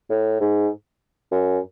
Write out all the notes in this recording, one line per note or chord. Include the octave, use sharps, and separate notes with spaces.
A2
G#2
F#2